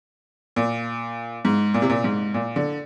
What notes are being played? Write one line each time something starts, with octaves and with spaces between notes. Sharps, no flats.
A#2
G#2
A#2
C3
A#2
G#2
A#2
D3